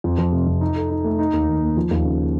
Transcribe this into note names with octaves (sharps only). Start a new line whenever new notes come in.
F2
F3
C3
F2
D#4
A4
D#4
A3
D#4
D#2
D#3
A#3
F3
D#2
C#3